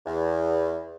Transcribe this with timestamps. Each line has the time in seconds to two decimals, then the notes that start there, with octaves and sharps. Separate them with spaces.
0.06 E2